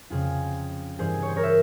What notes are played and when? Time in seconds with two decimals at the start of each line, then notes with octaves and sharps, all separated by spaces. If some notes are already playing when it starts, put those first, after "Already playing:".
0.10 F2 C#3 F3 F4 G#4
0.99 G2 E3 G#4 C5
1.22 C#5
1.28 C5
1.36 A#4 C#5
1.43 C5 E5